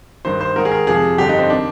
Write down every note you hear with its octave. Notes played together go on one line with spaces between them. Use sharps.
G2 D#3 C5
C5
G#2 D#3 A#4
G#4
A#4
F2 C3 F3 G#4
G2 D3 F3 G4
D#4
C4
D#3 D4